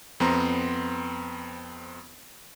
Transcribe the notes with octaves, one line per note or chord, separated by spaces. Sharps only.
F2 B3 C4 A#5 C6